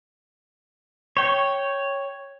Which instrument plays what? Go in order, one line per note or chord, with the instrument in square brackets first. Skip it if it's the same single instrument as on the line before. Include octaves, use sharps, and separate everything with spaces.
[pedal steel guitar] C#5 G5